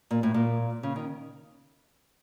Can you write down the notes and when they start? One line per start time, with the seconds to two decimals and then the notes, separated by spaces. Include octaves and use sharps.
0.11 A#2
0.23 A2
0.34 A#2
0.83 C#3
0.96 D#3